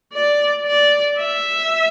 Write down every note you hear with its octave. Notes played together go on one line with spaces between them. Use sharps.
D5
D5
E5